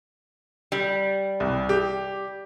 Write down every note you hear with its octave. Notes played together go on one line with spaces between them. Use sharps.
G3
C2
G4